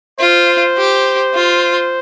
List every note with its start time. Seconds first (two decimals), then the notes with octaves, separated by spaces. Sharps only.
0.19 F4 C5
0.78 G4
1.34 F4